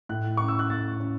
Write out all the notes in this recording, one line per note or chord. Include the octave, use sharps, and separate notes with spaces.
A2 F#6
C#4 C#6
E6
F#6
A2 A6
C#4